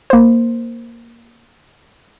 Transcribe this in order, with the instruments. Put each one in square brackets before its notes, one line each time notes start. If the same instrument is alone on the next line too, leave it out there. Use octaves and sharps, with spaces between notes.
[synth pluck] A#3 C5